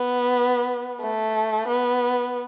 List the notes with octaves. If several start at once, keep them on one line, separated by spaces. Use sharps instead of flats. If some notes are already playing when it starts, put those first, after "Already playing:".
Already playing: B3
A3
B3